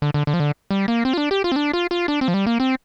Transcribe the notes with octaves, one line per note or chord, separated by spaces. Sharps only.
D3
D3
D3
F3
D3
G3
A#3
C4
F4
D4
G4
F4
C4
D4
F4
F4
D4
C4
F3
G3
A#3
C4